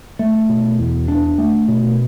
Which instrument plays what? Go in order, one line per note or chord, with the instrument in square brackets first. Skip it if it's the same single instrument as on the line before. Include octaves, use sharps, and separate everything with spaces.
[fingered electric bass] A3
B2
E2
D4
A3
B2